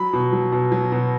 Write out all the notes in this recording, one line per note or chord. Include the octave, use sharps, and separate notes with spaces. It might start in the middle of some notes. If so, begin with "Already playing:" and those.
Already playing: F#3 B5
B2
F#3
B2
F#3
B2